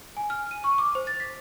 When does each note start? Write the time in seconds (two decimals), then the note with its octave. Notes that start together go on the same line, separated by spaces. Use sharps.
0.17 G#5
0.30 F6
0.51 D#7
0.64 C#6
0.78 D6
0.95 C5
1.07 A6
1.20 B6